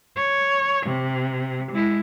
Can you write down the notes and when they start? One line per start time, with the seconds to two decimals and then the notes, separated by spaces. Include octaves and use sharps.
0.16 C#5
0.86 C3
1.71 G#3 E4